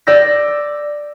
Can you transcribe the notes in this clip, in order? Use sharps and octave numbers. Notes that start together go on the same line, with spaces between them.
D5 E6 G6 A#6